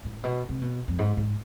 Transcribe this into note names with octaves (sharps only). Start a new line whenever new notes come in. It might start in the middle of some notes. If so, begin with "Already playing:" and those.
A2
B2
C3
B2
F2
G#2
G#2